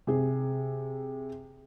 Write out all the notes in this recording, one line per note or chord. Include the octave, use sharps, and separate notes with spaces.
C3 G#4